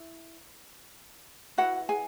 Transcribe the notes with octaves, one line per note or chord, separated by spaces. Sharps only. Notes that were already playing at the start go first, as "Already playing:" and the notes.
Already playing: E4
E4 F#4 B4 F#5
G#4 G#5